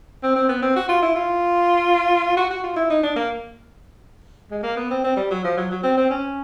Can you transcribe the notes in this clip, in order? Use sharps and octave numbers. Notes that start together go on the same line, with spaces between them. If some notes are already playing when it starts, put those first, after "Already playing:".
C4
C4
B3
C4
F#4
F4
E4
F4
F#4
F#4
F4
E4
D#4
D4
A#3
G#3
A#3
B3
C4
C4
G3
F#3
F3
F#3
F#3
C4
C4
C#4